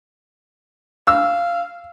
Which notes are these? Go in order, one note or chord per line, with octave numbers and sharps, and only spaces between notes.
F5 E6